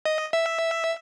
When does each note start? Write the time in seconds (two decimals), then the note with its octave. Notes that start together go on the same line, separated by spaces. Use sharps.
0.05 D#5
0.33 E5